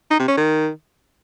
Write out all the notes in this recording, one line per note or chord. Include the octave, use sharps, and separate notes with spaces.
D#4
C3
C#4
D#3